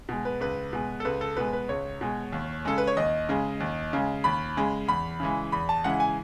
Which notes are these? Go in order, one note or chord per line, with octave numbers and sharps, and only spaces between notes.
B2 G#3
B4
C#2 B4
B2 G#3
A4
C#2 B4
A4
B2 G#3 B4
B4
C#2 C#5
B2 G#3
D#2
C#3 G#3 A4
B4
C#5
D#2 D#5
C#3 G#3
D#2
C#3 G#3
D#2 B5
C#3 G#3
E2 B5
C#3 E3 G#3
E2 B5
A5
C#3 E3 G#3 F#5
G#5